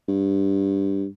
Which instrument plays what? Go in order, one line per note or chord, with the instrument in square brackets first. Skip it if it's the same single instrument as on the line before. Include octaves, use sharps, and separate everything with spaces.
[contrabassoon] G2